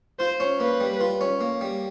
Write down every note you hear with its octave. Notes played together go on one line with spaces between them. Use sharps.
F4 C5
C#4
A#3 B4
G3
F4
C#4
A#3
G3